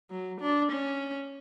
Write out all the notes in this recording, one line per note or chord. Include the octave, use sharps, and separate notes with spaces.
F#3
D4
C#4